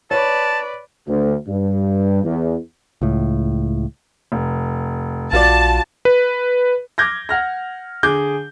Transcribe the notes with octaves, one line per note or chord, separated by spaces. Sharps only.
B4 C#5 D5 A5
D2
G2
E2
C#2 A2
F1
A#1 F4 F#4 D5 A5
B4
D6 F6 G6 G#6 A#6
F#5 F6 A#6
D3 G#4 D6 G6